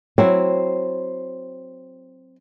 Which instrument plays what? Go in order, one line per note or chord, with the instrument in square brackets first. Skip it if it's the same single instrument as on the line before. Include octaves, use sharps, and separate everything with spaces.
[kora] F#3 E4 [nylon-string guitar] C4